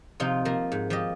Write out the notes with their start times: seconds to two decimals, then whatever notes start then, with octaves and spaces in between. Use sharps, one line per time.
0.20 C3 F3 D#4 F4
0.45 F3 A#3 A#4
0.72 G#2
0.90 F3 G4 D#5